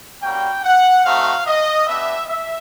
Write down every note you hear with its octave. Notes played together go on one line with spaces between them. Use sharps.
G3 A#3 C#4 F#4 G5
F#5
A3 C4 D#4 F#4 F5
D#5
B3 D4 G4 E5
E5